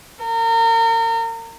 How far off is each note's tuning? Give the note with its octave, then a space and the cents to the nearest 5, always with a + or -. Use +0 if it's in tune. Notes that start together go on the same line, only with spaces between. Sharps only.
A#4 -35